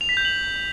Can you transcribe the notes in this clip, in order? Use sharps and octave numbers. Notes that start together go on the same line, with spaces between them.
F7
B6
G6
F#7